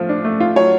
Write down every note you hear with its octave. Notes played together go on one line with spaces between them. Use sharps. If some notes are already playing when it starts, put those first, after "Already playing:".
Already playing: F3 A3 F4
D4
A3
F4
F#3 C#5